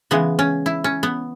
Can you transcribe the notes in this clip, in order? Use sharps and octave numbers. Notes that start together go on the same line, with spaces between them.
C#3 E3 G#3 B3
C#4
E4
C#4
B3